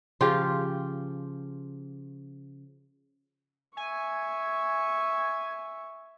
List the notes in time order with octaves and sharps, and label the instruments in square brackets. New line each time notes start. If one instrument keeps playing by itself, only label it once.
[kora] C#3 F3 F4 G4
[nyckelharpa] E5 C#6 [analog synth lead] G#5